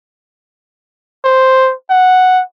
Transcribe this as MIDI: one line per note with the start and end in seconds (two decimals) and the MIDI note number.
1.24 1.73 72
1.90 2.42 78